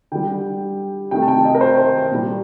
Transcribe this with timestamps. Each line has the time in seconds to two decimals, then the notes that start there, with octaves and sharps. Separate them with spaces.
0.12 D3 G3 G5
1.11 C3 D#3 A3 G5
1.22 A5
1.28 G5
1.45 D#5
1.55 A#4
1.61 C5
2.11 A#2 G3